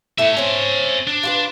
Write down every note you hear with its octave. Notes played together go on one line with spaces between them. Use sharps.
A3 E4 C#5 E5
C4 C#4
D4
F4 F#4 B4